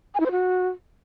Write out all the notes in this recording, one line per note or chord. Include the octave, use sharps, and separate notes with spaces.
G#5
E4
C5
F#4